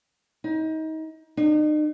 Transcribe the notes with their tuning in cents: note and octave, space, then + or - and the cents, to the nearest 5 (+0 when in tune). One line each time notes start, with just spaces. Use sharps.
D#4 +30
D#4 -40